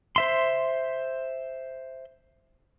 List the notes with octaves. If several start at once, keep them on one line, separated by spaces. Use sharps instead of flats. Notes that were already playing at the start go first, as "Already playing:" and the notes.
C5 E5 C6